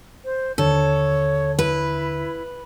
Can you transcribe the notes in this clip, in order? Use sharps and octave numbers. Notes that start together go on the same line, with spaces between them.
C5
D#2 D3 A4 C#5
E4 B4